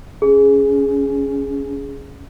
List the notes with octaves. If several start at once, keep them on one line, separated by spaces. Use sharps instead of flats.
C#4 G#4